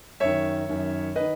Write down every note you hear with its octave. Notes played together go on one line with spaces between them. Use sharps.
F#2 D#3 C#5 E5
F#2 D#3
D#3 B4 D#5